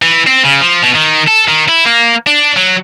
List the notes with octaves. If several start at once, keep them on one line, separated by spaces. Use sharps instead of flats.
E3
C4
C#3
F3
B2
D#3
A4
D#3
E4
A#3
D4
F#3